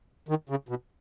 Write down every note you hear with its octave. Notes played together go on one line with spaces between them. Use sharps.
D#3
C#3
B2